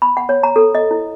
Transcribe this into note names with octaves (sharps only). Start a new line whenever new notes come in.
B5
F#5
C#5
A#5
A4
D#5
E4